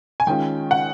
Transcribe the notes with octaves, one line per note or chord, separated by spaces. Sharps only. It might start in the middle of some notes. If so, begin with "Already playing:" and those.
G#5
D#3 G#3 C#4 F4 G5
F#5